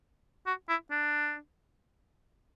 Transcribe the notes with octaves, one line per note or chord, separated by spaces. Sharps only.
F#4
E4
D4